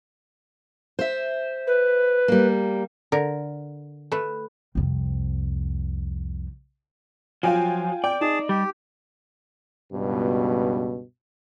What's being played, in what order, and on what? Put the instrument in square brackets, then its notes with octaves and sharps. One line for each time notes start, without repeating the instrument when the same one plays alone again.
[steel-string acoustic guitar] C5 E5
[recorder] B4
[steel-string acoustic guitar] G3 A#3
[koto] D3 A#4
A3 B4
[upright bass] C2 F2
[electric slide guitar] F3 F#3 [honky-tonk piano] F4 G5 G#5
[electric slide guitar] D5 [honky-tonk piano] G5
[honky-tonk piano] D#4 [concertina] G#4 A5
[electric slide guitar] G3 [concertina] G4
[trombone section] C#2 G2 B2